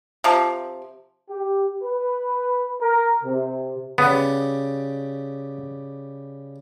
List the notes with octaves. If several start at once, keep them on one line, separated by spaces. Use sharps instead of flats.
C3 F3
G4
B4
A#4
C3
C#3 G3 B3